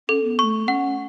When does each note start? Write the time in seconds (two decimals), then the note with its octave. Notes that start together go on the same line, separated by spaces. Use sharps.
0.09 C#4 A4
0.24 B3
0.39 A3 B3 C#6
0.68 C#4 F#5